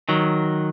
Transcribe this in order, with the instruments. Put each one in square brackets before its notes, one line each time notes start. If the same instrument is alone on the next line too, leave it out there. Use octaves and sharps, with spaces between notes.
[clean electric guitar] D#3 F#3